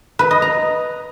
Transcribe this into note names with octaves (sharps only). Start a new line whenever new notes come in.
B4
D#5
A#5